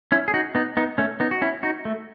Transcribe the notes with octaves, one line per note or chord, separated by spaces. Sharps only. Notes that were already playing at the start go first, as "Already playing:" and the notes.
C#4 E4
G#4
D#4 F#4
B3 D#4
B3 D#4
A3 C#4
B3 D#4
F#4
C#4 E4
D#4 F#4
A3